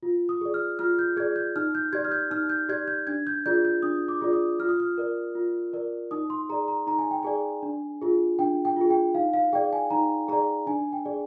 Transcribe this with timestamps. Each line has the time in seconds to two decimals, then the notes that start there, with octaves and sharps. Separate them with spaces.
0.03 F4
0.29 D#6
0.41 G#4 D5
0.54 F6
0.79 F4 F6
0.99 G6
1.17 G#4 D5 G#6
1.36 G6
1.56 D#4 F6
1.75 G6
1.93 G4 D5 G#6
2.04 F6
2.12 G6
2.31 D#4 F6
2.50 G6
2.69 G4 D5 G#6
2.88 G6
3.07 D4 G#6
3.27 G6
3.46 F4 G#4 D5 G6
3.65 G6
3.83 D4 D#6
4.08 D6
4.21 F4 G#4 D5
4.33 D#6
4.59 F4 F6
4.69 D#6
4.80 F6
4.98 A#4 D5
5.35 F4
5.73 A#4 D5
6.11 D#4 D#6
6.30 C6
6.49 G#4 D5 A#5
6.68 A#5
6.87 D#4 A#5
6.99 G#5
7.11 G5
7.23 G#4 D5 G#5
7.63 D4
8.02 F4 G#4
8.39 D4 G5
8.65 G5
8.76 F4 G#4
8.90 G5
9.14 D#4 F5
9.34 F5
9.53 G#4 D5 G5
9.73 G#5
9.90 D#4 A#5
10.28 G#4 D5 A#5
10.67 D4 G#5
10.93 G5
11.05 G#4 D5